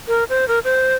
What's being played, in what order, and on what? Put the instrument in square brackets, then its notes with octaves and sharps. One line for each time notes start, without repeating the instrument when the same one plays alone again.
[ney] A#4
C5
A#4
C5